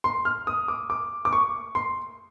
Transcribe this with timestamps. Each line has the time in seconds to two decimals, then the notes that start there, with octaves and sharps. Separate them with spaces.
0.04 C6
0.25 F6
0.47 D#6
0.68 D6
0.90 D6
1.25 D6
1.33 C#6
1.75 C6